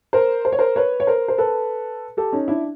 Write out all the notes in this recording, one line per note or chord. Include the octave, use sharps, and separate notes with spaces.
A#4 C5
C5
C#5
A#4 C5
B4 C#5
C#5
A#4 C5
C5
A4 B4
G4 A4
C#4 D#4
D4 E4